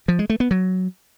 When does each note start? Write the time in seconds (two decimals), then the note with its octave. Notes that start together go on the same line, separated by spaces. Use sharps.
0.08 F3
0.19 G#3
0.30 A3
0.40 B3
0.51 F#3